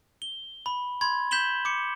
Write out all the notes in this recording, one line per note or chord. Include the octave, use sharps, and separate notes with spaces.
G7
B5
B5 C6 G#6
G6 B6 E7 F#7 G7
D6 C#7